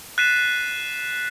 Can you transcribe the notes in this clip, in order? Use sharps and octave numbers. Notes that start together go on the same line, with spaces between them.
F#6 A6 B6 C7 D#7 E7